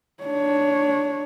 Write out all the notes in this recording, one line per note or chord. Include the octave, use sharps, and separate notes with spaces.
D4 C#5